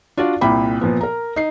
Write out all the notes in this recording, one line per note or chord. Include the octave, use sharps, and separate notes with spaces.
D4 F4 F#4 D5
C2 A#2 G5 B5 D6
A#2 F3 B3
A#4 A#5
D#4 C7